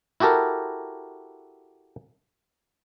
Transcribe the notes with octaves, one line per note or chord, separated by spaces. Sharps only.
E4 F#4 G4 A4 A#4